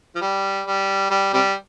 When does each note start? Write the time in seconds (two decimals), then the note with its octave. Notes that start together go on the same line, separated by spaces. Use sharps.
0.16 F3
0.21 G3
0.67 G3
1.11 G3
1.33 C3 G3